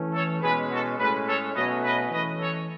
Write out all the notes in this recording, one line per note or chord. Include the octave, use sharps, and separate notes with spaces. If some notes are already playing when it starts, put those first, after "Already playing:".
Already playing: E3 A3 C#4
A4 C#5
B2 G#3 C#4 G#4 B4
F#4 A4
A2 G#3 C#4 G#4 B4
A4 C#5
B2 F#3 A3 C#4 B4 D#5
B4 D#5
E3 A3 C#4 B4 D#5
A4 C#5